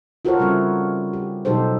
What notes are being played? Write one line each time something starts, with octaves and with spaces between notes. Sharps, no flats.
F4 F#4 A4 A#4 C5 C#5
C#3 G3 C4 C#4 E4
G4
B2 F#3 D#4 G4 A4 C5